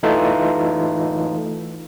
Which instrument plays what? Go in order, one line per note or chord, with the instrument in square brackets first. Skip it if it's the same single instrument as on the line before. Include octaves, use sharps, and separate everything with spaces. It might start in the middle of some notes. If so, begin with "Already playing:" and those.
[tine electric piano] E3 A3 D#4 F4 A4